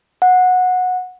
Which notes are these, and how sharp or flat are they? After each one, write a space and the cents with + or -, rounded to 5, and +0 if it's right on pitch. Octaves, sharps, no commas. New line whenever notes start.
F#5 -15